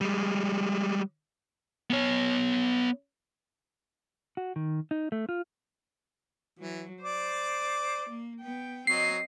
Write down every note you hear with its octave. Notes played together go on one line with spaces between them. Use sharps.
G3 G#3
B3 C#5
F#4
D#3
D#4
A3
F4
E3 F#3
C5 D5 D6
A#3
B3 G5
F#3 C4 D#5 C7